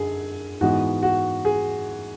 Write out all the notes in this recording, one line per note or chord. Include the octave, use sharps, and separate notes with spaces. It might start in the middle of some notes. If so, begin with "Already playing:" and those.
Already playing: F#2 D3 G#4
G#2 E3 G#3 B3 F#4
F#4
G#4